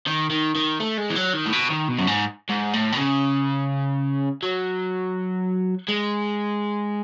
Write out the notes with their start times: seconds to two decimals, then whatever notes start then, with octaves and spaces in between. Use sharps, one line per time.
0.07 D#3
0.30 D#3
0.55 D#3
0.80 A3
0.97 G#3
1.10 E3
1.15 F#3
1.33 D#3
1.46 A2
1.52 B2
1.70 D#3
1.88 B2
1.99 F#2
2.07 G#2
2.49 G#2
2.73 A2
2.92 B2
2.97 C#3
4.43 F#3
5.88 G#3